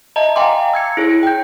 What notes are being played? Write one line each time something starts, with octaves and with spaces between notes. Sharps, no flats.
D#5 E5 A5 A#5
F5 G5 G#5 A#5 C6 D6
E6 G#6 C#7
E4 G#4 C#5
G5 G6